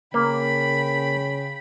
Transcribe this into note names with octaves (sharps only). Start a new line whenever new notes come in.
C#3 A#3 G5 B5